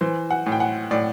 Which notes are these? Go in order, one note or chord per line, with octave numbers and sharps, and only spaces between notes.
E3 C5
F#5
A2
G5
F#5
A2 D5